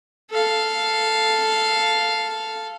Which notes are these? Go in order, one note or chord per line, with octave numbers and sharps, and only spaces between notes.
A4 F5